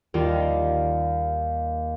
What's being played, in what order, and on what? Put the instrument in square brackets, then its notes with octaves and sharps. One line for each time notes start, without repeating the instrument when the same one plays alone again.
[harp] D#2 [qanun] D#3 G3 F4